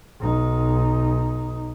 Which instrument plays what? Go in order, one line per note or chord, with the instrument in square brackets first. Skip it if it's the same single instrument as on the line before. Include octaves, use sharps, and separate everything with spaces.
[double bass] B1 D#4